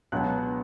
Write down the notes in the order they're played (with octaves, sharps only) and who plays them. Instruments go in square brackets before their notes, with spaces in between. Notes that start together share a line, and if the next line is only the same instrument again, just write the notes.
[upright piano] C#2 B2 F#3 B3 F#6